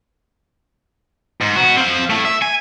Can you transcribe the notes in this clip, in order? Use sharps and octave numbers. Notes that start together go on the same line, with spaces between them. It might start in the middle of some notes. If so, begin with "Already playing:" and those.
G#2
B3 F#4
C4 F5
A3 E4
E5
G#5